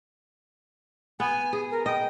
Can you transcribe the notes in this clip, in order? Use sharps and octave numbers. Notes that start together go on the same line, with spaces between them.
B3 G#5
G#4
A#4
D#5 G5